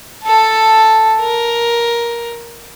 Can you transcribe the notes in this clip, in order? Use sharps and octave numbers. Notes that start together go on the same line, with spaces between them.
A4 A5
A#4